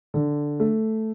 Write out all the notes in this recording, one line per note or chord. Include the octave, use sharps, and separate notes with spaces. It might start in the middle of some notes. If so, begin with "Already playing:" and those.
D3
A3